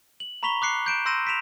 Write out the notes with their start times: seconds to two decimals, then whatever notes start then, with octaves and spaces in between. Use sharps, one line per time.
0.20 F#7
0.43 A#5 B5 C#6 B6 F7 G7
0.62 D6 F#6 C7 C#7
0.86 G6 D7 E7
1.06 C6 E6 G6 A#6 D#7 E7
1.27 B6 D7 E7 F7